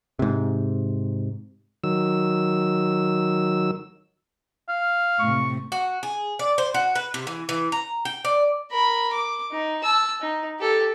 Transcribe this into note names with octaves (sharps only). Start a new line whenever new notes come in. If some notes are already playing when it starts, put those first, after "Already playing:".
G#2 C3
D#3 F#3 E6
F5
A2 C3 C#6
F#4
G#4
D5
C5
F#4
B4
C3
E3
E3
A#5
G5
D5
A#4 B5
D6
D#4
A5 E6
D#4
G4 A4